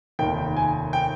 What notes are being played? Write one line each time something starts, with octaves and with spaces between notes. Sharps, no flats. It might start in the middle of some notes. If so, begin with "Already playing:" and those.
F1 D#2 D#3 G5
G#5
G5